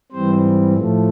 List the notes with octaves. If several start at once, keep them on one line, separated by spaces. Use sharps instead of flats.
G#2 E3 G3 C4 C5
A2 F3 A3